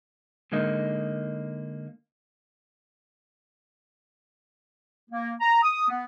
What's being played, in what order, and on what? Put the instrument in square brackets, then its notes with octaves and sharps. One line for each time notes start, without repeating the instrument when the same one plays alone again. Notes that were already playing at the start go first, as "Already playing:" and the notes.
[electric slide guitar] D3 G#3 A#3 D#4 D#5
[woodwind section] A#3
A#5
D#6
B3